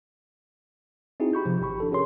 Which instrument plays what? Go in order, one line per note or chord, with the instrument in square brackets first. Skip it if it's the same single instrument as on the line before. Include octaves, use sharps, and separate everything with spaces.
[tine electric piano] C4 D#4 E4 F#4 G#4
G4 B5 C#6 G6
C3 F3
G#1 G4 B5 C#6
D4 A4
C#4 F#4 G#4 A#4 C#5 C6